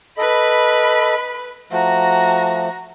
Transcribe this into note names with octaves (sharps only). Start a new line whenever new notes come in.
A4 B4 D#5 B5
F3 A3 F#4 A#5